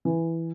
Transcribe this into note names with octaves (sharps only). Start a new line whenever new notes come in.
E3